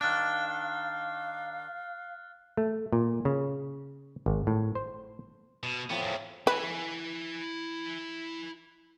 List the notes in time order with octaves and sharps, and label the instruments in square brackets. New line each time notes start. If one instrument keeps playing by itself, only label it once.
[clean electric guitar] D#3 D4 [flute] F5 [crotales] F6 F#6 A6
[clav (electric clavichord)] A3
A#2
C#3
G#1
A2
C5
[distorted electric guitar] B2
[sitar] A2 F3 C4 [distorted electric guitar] B3
[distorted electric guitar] E2 G#2
[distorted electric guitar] E4 G#5 [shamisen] B4